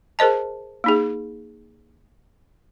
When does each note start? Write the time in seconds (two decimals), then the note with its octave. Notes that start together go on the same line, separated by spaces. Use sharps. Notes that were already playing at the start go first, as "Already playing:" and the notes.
0.19 G#4 A#4 C5 D#5 A5
0.84 A#3 D#4 G#4